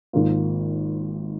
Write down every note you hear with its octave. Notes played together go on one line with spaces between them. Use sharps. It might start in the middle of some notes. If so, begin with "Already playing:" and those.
G#1 G#2 D#3 A#3 F4